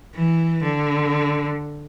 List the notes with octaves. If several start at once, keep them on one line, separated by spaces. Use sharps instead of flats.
E3
D3